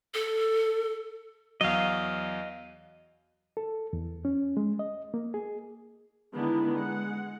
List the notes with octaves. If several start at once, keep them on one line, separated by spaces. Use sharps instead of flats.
A4
E2 F#3 D#5 F5
A4
E2
C#4
G#3
D#5
A#3
G#4
D3 D#3 G#3 B3 E4
G#3 F#5